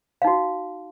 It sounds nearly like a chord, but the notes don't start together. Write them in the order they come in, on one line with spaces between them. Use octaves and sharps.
F5 D#4 F#4